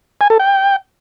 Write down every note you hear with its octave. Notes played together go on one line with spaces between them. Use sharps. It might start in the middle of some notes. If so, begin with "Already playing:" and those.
G#5
A4
G5